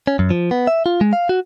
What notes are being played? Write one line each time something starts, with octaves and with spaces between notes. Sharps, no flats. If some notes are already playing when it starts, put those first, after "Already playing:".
C#4
F#2
F3
B3
E5
F4
G#3
F5
F#4